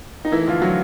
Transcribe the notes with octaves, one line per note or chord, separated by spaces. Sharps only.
D#4
E3 A3 E4
D3 F3 F4
F3 F#3 F#4